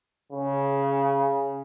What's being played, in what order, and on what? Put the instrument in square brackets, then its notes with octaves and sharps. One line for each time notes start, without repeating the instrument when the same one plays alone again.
[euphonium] C#3